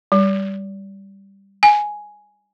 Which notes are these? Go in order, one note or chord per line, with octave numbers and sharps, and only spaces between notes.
G3
G#5